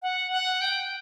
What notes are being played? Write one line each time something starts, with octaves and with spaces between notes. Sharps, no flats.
F#5
F#5
G5